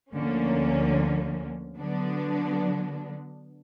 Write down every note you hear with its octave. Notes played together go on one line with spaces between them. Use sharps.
D2 D3 F3 A#3 C#4
D3 F#3 B3 D4